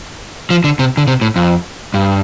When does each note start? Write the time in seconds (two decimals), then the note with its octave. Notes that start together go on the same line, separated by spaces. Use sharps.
0.50 F3
0.64 D3
0.79 C3
0.97 D3
1.07 C3
1.21 A2
1.36 F2
1.94 G2